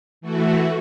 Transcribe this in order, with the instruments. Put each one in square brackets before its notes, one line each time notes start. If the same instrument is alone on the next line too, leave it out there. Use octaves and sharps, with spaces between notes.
[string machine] E3 A3 F#4